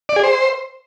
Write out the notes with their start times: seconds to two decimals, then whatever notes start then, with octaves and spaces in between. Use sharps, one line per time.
0.09 D5
0.16 G#4
0.24 C5